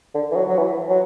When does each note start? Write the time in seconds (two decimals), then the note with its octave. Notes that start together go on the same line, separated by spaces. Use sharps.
0.14 D3
0.31 E3
0.36 F#3
0.48 F#3
0.58 E3
0.90 F#3